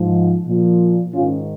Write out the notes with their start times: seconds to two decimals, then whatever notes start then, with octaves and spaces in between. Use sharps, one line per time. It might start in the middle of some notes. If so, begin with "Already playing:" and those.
Already playing: G#2 F3
0.47 A#2 F3
1.14 G#2 D#3 C#4 F4